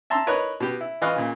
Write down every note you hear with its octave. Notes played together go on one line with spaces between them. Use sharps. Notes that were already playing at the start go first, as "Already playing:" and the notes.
E5 A5 A#5 C6 E6
A#4 B4 C#5 D#5 A#5 F#6
B2 G4
E4
E3 F4 D#5 F5 C#6 F#6
A#2 C#3